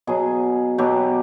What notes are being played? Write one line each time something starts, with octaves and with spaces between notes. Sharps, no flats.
B2 F#3 G#4
B2 F#3 G4